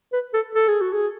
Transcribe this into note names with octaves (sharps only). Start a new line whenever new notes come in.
B4
A4
A4
G#4
F#4
G#4